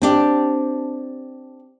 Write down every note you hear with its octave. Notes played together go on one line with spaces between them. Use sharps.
C4 D4 G4